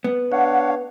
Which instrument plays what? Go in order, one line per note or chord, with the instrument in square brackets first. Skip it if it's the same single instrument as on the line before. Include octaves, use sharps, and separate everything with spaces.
[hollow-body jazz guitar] B3
[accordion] D4 C#5 F5 [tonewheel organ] F#5